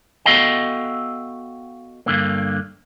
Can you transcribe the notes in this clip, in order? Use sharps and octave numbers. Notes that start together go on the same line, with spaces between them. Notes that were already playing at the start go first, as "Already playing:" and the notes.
B3 F#4 A4 D#5 F5 G5
G2 D3 A#3